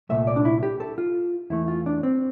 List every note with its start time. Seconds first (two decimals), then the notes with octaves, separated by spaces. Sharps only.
0.09 C2 A#2 A3 E5
0.27 D5
0.36 D4
0.45 E4
0.63 G4
0.80 A4
0.98 F4
1.50 E2 E3 A3 E4
1.68 F4
1.86 D4
2.03 C4